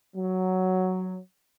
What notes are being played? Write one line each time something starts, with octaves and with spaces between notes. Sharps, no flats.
F#3